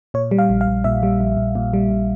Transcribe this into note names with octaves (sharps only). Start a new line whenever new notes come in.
A#2 C#5
G3
F5
A#1
F5
A#1
A#2 E5
G3
A#1
A#1
A#2
G3
A#1